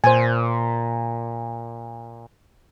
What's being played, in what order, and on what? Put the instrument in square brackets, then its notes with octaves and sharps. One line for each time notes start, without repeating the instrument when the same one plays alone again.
[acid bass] A#2 [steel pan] C5 G#5